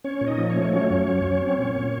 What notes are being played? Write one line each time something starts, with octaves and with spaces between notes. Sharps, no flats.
C#4 C#5
A#2
D#4 D#5
F3
C#4 C#5
A3
F#3 C#4 C#5
F#2
F#3
F#3
C4
A#2
A#2